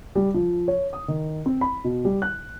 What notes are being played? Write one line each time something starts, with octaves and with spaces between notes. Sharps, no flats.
G3
F3
C#5
D#6
D#3
C4
B5
B2
G3
F#6